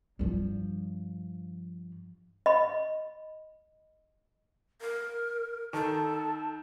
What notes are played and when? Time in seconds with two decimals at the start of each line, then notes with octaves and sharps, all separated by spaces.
0.19 G2 F3
2.46 D#5 B5
4.81 A#4
5.73 D#3 A4 A5